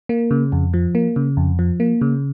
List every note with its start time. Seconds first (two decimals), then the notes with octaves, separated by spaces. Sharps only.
0.09 A#3
0.31 C#3
0.52 F2
0.74 F3
0.95 A#3
1.16 C#3
1.37 F2
1.59 F3
1.80 A#3
2.01 C#3